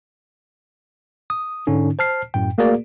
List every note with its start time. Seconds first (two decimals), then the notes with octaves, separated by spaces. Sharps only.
1.30 D#6
1.67 G#2 D3 C#4 D#4
1.99 C5 A5 F6 C7
2.34 F#2 A2 G5
2.58 A3 A#3 F#4 G#4 A#4 D5